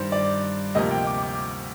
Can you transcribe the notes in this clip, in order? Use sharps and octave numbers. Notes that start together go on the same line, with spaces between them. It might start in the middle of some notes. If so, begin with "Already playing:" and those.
Already playing: G2 D#3 G3 C5
D5
D2 C3 F3 A#3 D#5
G5
D6
D6